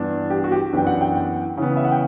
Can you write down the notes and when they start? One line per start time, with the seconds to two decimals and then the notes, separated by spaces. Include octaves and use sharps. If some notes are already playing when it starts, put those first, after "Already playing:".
Already playing: G2 E3 B3 D4
0.30 G4
0.44 F#4
0.52 G4
0.73 F#2 E3 B3 D4 G5
0.87 F#5
1.01 G5
1.15 G5
1.57 C#3 E3 B3
1.77 E5
1.85 F#5
1.92 G5